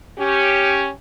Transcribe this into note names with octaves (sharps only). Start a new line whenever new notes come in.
C#4 G4